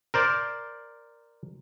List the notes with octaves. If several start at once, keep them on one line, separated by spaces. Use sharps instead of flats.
A#4 C5 D5